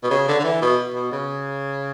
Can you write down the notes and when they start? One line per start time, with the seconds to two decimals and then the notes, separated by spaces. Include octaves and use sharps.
0.04 B2
0.11 C#3
0.28 D3
0.40 D3
0.44 E3
0.62 B2
0.94 B2
1.12 C#3